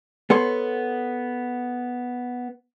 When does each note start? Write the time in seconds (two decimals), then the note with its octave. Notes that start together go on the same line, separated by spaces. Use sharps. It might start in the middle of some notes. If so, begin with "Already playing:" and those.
0.30 B3 A4 C#5 C6